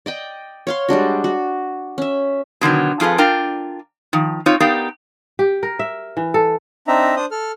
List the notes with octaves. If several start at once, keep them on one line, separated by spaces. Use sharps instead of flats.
D5 D#5 G5
C#5 F5 C6
G3 G#3 D4 F#4
F#4
C#4 E5
B2 D3 D#3 F#3
F2 F4 G#4 A4 B4
D4 F4 A#4 G5
D#3 F3
C4 D#4 F4 C#5
B3 D#4 G4 A#4 D5 F5
G4
A#4
E5
E3
A4
C4 D4 D#4 E5 A#5
D4 C5 D#6
A4 F6